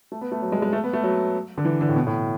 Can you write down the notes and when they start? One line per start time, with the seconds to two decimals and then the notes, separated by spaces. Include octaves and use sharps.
0.12 A3
0.21 B3
0.32 A3
0.42 F#3
0.52 G#3
0.62 G#3
0.73 A3
0.84 B3
0.93 A3
1.03 F#3
1.58 D3
1.65 E3
1.81 D3
1.89 A2
1.96 B2
2.07 A2